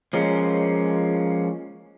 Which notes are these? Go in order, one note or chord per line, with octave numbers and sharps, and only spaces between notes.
F3 G#3 A#3 C#4